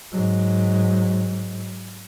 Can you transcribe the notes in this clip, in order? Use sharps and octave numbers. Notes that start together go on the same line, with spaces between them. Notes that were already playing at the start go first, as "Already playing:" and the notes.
G#2 F#3